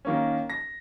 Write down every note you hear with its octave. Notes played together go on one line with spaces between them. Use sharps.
D#3 A#3 C#4
A#6